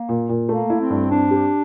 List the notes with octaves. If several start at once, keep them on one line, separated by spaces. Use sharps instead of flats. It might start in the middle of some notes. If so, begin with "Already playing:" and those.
Already playing: A#3
A#2
A#2
A3 A#3
E4
C4
G2
C4 D4
G4